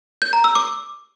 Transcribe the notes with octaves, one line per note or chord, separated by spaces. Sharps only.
G6
A#5
E6
D6